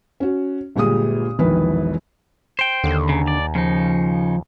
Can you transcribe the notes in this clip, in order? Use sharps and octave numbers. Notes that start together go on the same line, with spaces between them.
C#4 F#4
G1 A#2 G#3 G4 D#6
E1 A#1 D#3 E3 B4
C5 G5
D#2 D3
C#3
D5
C#3 F3 D#4